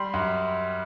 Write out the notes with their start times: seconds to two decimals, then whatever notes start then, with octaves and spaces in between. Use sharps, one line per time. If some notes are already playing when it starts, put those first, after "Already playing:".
Already playing: G3 C6
0.14 F#2